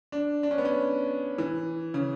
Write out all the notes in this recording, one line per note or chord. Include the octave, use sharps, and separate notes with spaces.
D4
D4
C#4
B3
C#4
E3
C#3